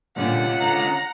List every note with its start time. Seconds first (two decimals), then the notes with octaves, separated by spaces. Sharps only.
0.18 A#2 D3 G3 C#4 F4 F#5
0.62 D3 A4 A5 A#5